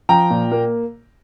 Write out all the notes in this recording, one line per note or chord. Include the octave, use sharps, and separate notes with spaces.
F3 G5 A#5
A#2
A#3